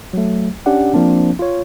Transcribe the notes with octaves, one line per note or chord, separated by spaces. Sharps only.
F#3 A3
C#4 D4 G4 D5 F#5
F3 A#3 C4 D4
F4 C#5